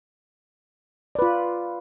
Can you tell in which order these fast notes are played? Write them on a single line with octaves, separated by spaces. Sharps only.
D5 B4 F4